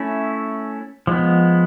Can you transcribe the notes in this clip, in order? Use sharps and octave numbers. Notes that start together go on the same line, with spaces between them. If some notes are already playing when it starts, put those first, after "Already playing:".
Already playing: A3 C#4 E4
F3 G#3 B3